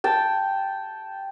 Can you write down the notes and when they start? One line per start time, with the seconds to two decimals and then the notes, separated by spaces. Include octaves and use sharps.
0.04 G5 A5